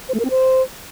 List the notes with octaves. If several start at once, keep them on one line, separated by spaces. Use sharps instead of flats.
C5
A3
A#4
C4
C5